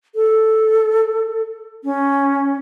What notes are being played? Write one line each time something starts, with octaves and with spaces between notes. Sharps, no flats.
A4
C#4